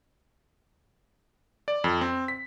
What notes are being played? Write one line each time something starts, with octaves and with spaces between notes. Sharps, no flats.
D5
F2
C4
B6